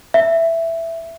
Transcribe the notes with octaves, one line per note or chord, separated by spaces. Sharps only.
E5